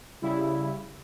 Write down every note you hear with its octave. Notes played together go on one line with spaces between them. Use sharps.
C#3 G3 E4